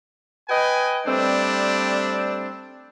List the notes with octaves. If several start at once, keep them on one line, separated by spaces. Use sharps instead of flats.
B4 D#5 G5 G#5
G3 A3 C4 D4